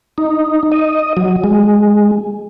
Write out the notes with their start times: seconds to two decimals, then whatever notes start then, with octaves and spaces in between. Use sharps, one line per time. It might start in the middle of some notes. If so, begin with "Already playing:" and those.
0.18 D#4
0.72 D#5
1.17 F#3
1.44 G#3